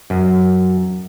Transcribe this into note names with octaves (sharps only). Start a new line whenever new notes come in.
F#2